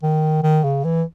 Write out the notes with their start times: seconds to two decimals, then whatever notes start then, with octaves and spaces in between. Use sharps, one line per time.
0.03 D#3
0.43 D#3
0.64 C#3
0.84 E3